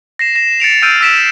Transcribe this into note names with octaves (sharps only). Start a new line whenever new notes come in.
A#6 C7 E7
A#6 E7
A6 C#7 D7 F7
E6 F6 G6 C7 D7 D#7
E6 A#6 B6 D7 E7